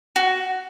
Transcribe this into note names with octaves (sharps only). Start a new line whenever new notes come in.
F#4